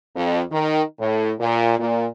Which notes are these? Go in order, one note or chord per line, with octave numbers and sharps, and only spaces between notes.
F2
D#3
A2
A#2
A#2